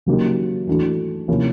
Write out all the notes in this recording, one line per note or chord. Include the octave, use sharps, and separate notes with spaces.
C#3 F#3 A#3 D#4 G4
E3 A3 D4 F#4
C3 F3 A#3 C#4 E4